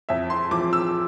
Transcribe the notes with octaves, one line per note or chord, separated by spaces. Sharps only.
F2 E5
C6
F3 D6
E6